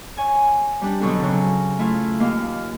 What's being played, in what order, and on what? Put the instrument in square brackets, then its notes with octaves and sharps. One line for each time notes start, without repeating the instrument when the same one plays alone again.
[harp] C#5 G#5
G3 D4
B2 D3 F#3 C4 D4 A4
C#3 F#3
A3 E4 F4
D#2 A#3 F5